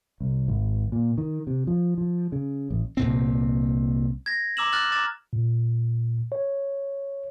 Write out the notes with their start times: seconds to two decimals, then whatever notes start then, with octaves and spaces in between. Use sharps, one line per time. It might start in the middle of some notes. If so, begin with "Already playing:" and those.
0.20 C2
0.48 G#1
0.92 A#2
1.18 D#3
1.47 C3
1.67 F3
1.98 F3
2.32 C#3
2.71 A1
2.97 C2 A#2 C4
4.26 G#6 A#6
4.57 A#5 D6 E6 E7 F#7
4.73 F6 F#6 A6 F#7
4.92 A#5 D6 A6 E7
5.33 A#2
6.32 C#5